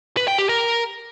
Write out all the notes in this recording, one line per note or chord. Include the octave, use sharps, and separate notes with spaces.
B4
G5
G4
A#4